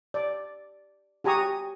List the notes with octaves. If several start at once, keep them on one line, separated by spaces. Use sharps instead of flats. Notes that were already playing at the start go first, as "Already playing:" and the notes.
D5
F#4 G4 G#5 A#5 C#6 D#6